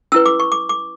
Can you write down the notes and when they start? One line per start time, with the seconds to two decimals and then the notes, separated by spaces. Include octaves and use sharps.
0.12 C#4 E4 B4 E6
0.26 D6
0.40 C#6
0.52 D6
0.69 D6